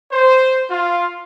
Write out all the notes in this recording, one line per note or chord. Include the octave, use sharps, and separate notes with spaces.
C5
F4